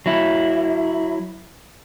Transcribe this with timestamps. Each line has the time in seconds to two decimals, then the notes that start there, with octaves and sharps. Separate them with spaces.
0.06 F#3 E4